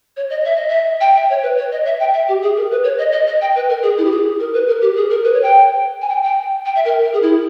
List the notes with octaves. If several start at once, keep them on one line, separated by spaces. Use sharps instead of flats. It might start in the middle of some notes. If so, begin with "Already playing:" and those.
C#5
D#5
E5
D#5
E5
G5
E5
C#5
B4
C#5
D#5
E5
G5
E5
G4
G#4
A#4
B4
C#5
D#5
D#5
D#5
G5
B4
A#4
G#4
E4
G4
G#4
A#4
B4
A#4
G4
G#4
A#4
B4
C#5
G5
G#5
G5
G5
G5
E5
A#4
A#4
G#4
E4